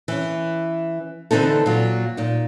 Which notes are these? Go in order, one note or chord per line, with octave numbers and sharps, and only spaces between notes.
E3 C#4
D3 E3 C4 D#4 A4
A#2 F#3
A#2 D#4